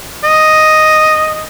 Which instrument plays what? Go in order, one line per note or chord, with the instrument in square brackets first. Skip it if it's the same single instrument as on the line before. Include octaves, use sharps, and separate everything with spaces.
[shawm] D#5